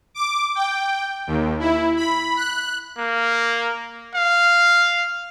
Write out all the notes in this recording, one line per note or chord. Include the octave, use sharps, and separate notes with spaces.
D6
G5
D#2
E4
B5
F#6
A#3
F5